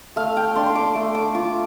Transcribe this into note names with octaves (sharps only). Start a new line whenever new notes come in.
A3 F5
G5
D4 C6
C6
D6
A3
D6
F4 D6